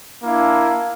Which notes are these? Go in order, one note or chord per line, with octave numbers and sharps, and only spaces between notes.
A#3 D4 E4 F5